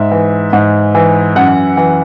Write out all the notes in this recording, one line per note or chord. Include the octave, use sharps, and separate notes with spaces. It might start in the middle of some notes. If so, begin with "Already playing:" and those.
Already playing: G#2 E5
E3
G#2
E3
F#2 F#5
E3